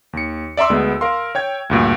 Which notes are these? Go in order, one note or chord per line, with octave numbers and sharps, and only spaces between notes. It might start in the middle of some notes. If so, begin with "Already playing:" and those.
D#2 C#7
D5 E5 A#5 C6 E6
D2 G#3 B3
A#4 F5 C6
C#5 G5 G#6
D2 G2 A#2